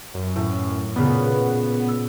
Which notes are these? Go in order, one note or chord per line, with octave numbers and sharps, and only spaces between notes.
F#2
A2
A#2 C#3 B3
E6